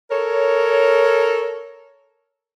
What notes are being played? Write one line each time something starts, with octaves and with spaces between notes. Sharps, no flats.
A4 A#4 C#5